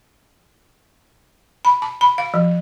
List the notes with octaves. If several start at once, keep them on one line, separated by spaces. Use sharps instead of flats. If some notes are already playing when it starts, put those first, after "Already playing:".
B5
A5
B5
F5
F3